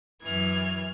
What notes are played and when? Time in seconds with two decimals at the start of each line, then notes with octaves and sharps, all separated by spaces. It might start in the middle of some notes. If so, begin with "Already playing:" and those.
0.23 F#2 E3 F6 G#6